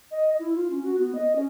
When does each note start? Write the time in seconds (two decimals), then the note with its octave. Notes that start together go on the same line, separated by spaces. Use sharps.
0.11 D#5
0.39 E4
0.55 F4
0.70 C#4
0.83 F#4
0.99 B3
1.15 D#5
1.35 C#4